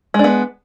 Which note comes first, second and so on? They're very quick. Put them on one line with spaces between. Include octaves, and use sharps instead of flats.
G#3 D4 B3